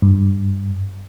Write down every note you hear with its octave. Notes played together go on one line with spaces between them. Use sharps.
G2